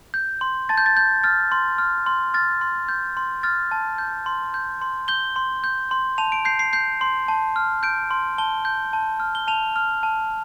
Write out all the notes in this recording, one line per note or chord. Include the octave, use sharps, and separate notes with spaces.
G6
C6
A5 A6
G6
A6
G6
F6 A6
C6
F6
C6
F6 A6
C6
G6
C6
F6 A6
A5
G6
C6
G6
C6
G6 G7
C6
G6
C6
A5 F7
D7
G6 C7
C7
G6 C7
C6
A5
F6
G6 D7
C6
A5 G7
G6
A5
F6
G7
A5 F7
F6
A5